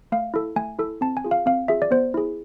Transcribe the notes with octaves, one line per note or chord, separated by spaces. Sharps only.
A3 F5
E4 A4
A3 G#5
E4 A4
C4 A5
G#5
F4 G#4
F5
C4 F5
F4 G#4 E5
D5
B3 C5
E4 G#4